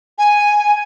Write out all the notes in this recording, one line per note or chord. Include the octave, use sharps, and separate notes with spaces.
G#5